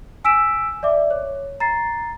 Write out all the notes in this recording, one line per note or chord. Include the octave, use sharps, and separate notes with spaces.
G#5 E6 B6 D7 E7
D5 E5 D6
C#5
A#5 A6 C7